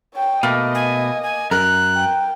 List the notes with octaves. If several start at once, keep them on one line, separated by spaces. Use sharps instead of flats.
C#5 G5
B2 A3 A#3 D#5
G#5
G#5
F#2 A#4 F#6
G5